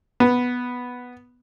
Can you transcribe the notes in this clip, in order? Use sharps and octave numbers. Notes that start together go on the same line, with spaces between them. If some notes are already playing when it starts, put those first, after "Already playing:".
B3